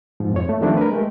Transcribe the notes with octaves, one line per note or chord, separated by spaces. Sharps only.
G#2 F3
F2 C#5
A3
D#3 F3 G3 A3 C4 D4
A#4 B4
G#3 A3 G4